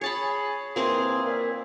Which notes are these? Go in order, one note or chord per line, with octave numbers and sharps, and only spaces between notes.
G#4 C#5 A5 B5
D#2 E3 A#3 C4 G#4 C5
A#2 E4